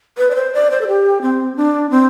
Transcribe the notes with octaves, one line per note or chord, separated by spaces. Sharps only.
B4
D5
C5
D5
C5
A4
G4
C4
D4
C4